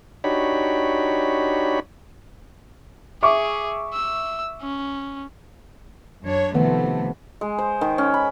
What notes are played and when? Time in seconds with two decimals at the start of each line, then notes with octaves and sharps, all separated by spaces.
0.24 D4 D#4 F#4 G4 C#5 B5
3.23 G#4 E5 C#6 D6
3.93 E6
4.62 C#4
6.23 F#2 D4 C#5
6.54 C3 D#3 F3 A3 B3
7.41 G#3
7.58 C5
7.81 D#3
7.98 C#4
8.14 B5